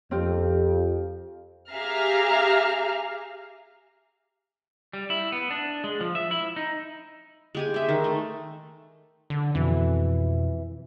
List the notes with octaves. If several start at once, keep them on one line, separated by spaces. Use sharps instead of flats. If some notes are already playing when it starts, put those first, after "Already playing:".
F2 C4 F4 G4
G4 G#4 E5 F5 A#5 F6
G3
E4
B3
D4
G#3
F3
E5
E4
D#4
G#3 G4 G#5
G#3 E5
D#3
A3
D3
F2 B2 E3